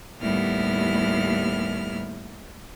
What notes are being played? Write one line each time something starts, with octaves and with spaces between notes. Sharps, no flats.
D#2 A2 G3 B3 E4 F6